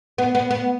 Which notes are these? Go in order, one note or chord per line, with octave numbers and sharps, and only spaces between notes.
B3
B3
B3